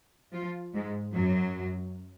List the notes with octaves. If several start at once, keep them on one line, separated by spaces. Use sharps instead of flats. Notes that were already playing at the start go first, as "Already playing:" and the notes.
F3 F4
G#2 G#3
F#2 F#3